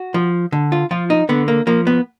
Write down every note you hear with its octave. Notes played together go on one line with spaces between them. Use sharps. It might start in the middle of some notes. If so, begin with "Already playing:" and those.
Already playing: F#4
F3
D3
F4
F3 F4
D#4
D3 B3
A#3
F3 A#3
B3